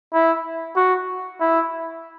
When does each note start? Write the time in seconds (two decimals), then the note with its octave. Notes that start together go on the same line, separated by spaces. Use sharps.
0.13 E4
0.76 F#4
1.40 E4